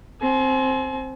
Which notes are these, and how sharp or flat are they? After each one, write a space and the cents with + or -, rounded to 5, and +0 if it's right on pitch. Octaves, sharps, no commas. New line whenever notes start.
C4 +5 G#5 +45